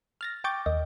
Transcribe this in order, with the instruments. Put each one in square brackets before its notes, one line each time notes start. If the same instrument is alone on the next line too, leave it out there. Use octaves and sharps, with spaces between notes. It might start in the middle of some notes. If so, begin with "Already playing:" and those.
[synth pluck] F6 A6 A#6
G5 C#6 D6 G6 A6
D#2 D#5